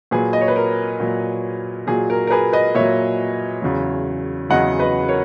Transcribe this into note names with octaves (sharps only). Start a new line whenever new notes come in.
A#2 F#3 G#4 B4
D#5
C#5
B4
A#4
A#2 F#3
A#2 F#3 G#4
A#4
A#4
G#4 B4
B4 D#5
A#2 F#3 C#5 E5
E2 C#3 F#3
E2 C#3 F#3 D#5 F#5
B4 D#5
A#4 C#5